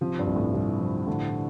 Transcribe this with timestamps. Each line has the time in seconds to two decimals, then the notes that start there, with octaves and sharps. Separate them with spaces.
0.01 C3 F3
0.19 G2
0.27 C2
0.36 A2
0.54 C2
0.81 F3
1.07 A2 D3